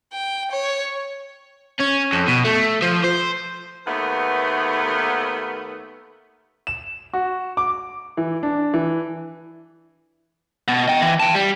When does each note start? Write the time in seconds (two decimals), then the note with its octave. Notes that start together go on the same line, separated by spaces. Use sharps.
0.13 G5
0.52 C#5
1.80 C#4
2.13 F2
2.28 B2
2.45 A3
2.82 F3
3.04 C5
3.87 D#2 A3 B3
6.67 E7
7.13 F#4
7.57 D6
8.17 E3
8.43 D4
8.74 E3
10.68 B2
10.88 D#5 G5
11.02 E3
11.20 G5 A5
11.35 G3